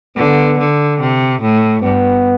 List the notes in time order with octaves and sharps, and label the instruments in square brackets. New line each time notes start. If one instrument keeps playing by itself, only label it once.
[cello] D3 [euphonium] B3
[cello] D3
C3
A2
[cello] G2 [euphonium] B3